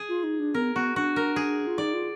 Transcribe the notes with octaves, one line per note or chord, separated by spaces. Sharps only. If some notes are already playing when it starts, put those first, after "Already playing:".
Already playing: G#4
F4
D#4
D4
B3 A#4
B3 F#4
D4 F#4
A#4
G#4
F4
D#4 D5
F4